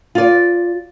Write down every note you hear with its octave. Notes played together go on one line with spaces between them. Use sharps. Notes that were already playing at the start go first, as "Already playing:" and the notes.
F4 D5